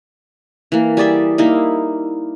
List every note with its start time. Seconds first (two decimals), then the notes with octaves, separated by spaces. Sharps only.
0.72 E3 A#3
0.97 G3 G#4 D5 E5
1.38 A#3 D#4 E4